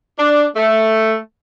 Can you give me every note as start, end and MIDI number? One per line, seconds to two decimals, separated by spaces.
0.19 0.46 62
0.56 1.16 57